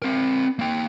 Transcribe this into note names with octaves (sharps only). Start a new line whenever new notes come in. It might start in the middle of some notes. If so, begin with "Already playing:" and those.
C4 A#4
A#3 G5